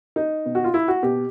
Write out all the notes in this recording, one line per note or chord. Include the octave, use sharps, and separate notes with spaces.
D#4
B2
F#4
F4
E4
F#4
B2 G4